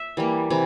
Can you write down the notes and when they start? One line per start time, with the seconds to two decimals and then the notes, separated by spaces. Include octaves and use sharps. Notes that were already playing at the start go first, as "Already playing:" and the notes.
Already playing: E5
0.17 E3 G3 A#3
0.50 C3 E3